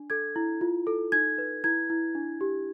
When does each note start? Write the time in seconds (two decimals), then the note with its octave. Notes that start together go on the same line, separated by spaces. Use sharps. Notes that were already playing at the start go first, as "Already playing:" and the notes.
Already playing: D4
0.10 A4 G#6
0.36 E4
0.61 F4
0.87 A4
1.12 D#4 G#6
1.38 B4
1.64 E4 G#6
1.90 E4
2.15 D4
2.41 G4